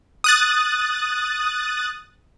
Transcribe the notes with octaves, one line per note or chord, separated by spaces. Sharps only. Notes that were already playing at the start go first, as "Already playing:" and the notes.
D#6 F#6 A6